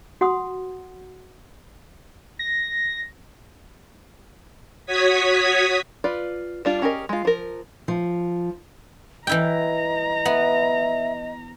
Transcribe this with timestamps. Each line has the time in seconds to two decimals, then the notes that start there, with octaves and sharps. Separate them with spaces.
0.21 F#4 F#5 C6 D#6
2.39 A#6
4.86 F#4 C#5 D#6 G#6 B6
6.04 F4 B4 D5
6.65 G3 D4 F4
6.82 C#4 G4 G#4 A#4 D#5
7.09 G#3 F4
7.25 F3 A#4
7.88 F3
9.27 E3 E4 D#5 G5 A#5
10.25 B3 E5